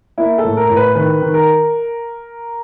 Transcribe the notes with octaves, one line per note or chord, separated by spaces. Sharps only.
A#3 E4
A4
A2
A#4
A2
B4
D#3 B4
D#3
A#4